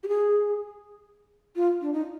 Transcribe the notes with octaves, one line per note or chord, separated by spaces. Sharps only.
G4
G#4
F4
D4
D#4